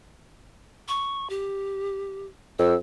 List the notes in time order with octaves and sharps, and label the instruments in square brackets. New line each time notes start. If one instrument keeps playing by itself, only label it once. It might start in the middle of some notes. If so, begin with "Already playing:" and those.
[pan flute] C#6
G4
[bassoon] F2 [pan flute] E6